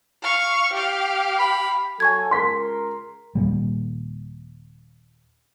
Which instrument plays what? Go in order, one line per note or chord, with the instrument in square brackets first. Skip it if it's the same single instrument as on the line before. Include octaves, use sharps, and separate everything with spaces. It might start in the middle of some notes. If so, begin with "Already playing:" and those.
[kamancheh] F5 C#6
G4 F5
[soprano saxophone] B5
[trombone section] F#3 A4 [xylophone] G#5 C#6 G#6
[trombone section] C#2 A#4 [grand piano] C6 B6
[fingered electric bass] D#1 A#1 A#2 G3